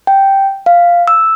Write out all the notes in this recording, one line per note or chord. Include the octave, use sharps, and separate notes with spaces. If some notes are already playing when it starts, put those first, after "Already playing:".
G5
F5
E6